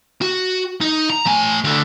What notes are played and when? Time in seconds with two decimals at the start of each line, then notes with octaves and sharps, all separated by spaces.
0.22 F#4
0.81 D#4
1.10 A#5
1.26 A3 G#5
1.64 D2 D3